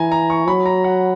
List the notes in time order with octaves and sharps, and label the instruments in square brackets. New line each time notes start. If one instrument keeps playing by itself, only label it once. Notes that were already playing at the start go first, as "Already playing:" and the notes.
Already playing: [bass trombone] E3 [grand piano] G#5 A#5
[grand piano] A#5
C#6
[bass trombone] F#3 [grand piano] B5
[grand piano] A#5
F#5